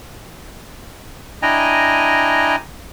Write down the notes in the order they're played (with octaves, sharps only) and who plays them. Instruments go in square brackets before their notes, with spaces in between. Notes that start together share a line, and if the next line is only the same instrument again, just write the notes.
[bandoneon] D4 E4 D#5 G5 G#5 A#5